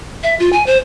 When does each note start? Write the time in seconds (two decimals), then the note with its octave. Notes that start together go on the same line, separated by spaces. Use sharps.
0.23 E5
0.40 F4
0.53 G#5
0.66 C5